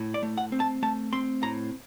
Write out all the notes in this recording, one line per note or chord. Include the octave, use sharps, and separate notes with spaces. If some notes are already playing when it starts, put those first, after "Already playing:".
Already playing: A2
D5
A3
F#5
C4
A5
A3 A5
C4 C6
A2 A#5